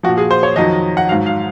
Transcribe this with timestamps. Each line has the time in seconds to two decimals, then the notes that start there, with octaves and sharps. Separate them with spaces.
0.03 F3 F#4
0.09 A#2
0.18 G#4
0.31 C5
0.43 C#5
0.56 F2 D#3 F#3 D#5
0.97 F#5
1.09 G#2 F#3 F5
1.26 F5